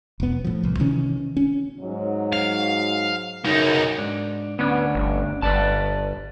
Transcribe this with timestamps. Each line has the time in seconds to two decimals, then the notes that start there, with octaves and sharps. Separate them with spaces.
0.20 E1 B3
0.45 A2 F3
0.63 C2
0.79 C3 D#3 E3 C#4
1.37 C#4
1.81 G#2 F#3
2.33 F5
3.45 F#2 C#3 B3 D#4
3.98 G#2 D4
4.59 D2 B3 C#4 D4
4.95 G1
5.42 G1 B4 D5 A5